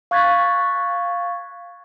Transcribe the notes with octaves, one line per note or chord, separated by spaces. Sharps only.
F5 C#6 F#6 G#6 A6 B6